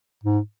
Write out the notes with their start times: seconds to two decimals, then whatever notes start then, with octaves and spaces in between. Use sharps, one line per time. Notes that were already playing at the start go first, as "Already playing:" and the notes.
0.24 G#2